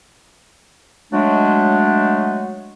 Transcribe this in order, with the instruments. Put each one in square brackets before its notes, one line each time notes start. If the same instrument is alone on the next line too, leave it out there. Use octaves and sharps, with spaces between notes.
[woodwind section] F#3 G#3 A3 D4